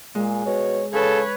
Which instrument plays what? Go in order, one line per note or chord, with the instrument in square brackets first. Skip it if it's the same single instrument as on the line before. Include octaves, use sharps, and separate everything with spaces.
[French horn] A#2 [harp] G#3
[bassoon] B2 [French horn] C#5
[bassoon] C#3 [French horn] A4 [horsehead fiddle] B4 C#5